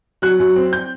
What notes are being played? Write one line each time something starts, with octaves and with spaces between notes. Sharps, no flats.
F#3 F#6
F#2
C4
G6